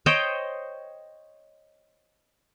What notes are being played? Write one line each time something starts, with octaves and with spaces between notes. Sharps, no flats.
C5 C#5 D#5 G5